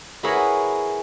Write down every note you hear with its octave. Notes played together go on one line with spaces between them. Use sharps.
E4 F#4 G#4 A#4 B4 C#5